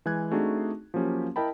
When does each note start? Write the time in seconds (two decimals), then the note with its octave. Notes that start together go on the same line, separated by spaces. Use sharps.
0.06 E3 G#3 G#5 F#6 G#6
0.31 A3 C4 D4 D#4 F#4 G#4
0.94 F3 F#3 A#3 C#4 G4
1.36 E4 A#4 D#5 G5 A5 B5